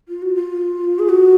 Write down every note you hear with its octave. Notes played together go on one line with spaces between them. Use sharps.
F4
F#4
F4
G#4
F#4